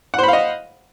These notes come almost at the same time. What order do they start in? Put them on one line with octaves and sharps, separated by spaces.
F#5 C5 B5 F5 D#5